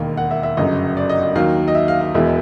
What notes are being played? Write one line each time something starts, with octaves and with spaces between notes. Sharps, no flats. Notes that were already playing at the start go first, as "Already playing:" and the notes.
Already playing: E1 D#2 D#3 F5
F#5
E5
E5
G1 F#2 C#3 F#3 D#5
D5
D#5
D#5
D#2 D#3 F#3 F5
D#5
E5
F5
F5
E1 E2 B2 G#3 E5